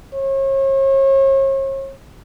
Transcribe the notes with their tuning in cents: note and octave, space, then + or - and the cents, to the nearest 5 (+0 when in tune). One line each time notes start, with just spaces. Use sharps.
C#5 -40